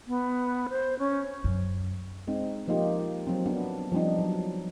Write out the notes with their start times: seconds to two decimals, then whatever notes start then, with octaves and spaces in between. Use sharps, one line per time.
0.07 B3
0.69 C5
0.99 C#4
1.44 F#2
2.27 G#3 C4 D#4
2.68 F3 A#3 D#4 F4 G4
3.27 F#3 C4
3.46 B3 D4
3.92 F3 G3 C4 D4 D#4
4.19 F#3